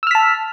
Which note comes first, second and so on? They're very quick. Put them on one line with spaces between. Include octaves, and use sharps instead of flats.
E6 F6 B6 A5